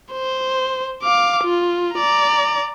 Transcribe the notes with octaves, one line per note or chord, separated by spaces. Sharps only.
C5
F5 D6
F4
D5 A#5